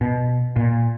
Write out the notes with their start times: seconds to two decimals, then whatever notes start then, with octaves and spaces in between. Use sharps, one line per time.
0.01 B2
0.56 A#2